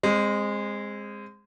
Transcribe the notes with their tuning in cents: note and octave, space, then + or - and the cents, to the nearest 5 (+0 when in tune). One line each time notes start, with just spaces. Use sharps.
G#3 -15 C4 +15